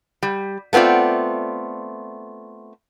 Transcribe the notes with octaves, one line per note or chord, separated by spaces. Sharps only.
G3
A3 B3 C4 F4 D5